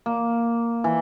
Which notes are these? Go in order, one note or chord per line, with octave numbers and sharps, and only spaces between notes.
A#3
E3